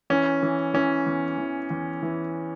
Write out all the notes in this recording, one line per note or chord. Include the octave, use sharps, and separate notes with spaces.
E3 C#4
E3
E3 C#4
E2
E3
E2
E3